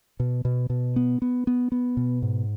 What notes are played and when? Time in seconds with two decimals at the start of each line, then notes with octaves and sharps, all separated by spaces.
0.20 B2
0.45 B2
0.70 B2
0.96 B3
1.22 B3
1.47 B3
1.72 B3
1.97 B2
2.22 G#2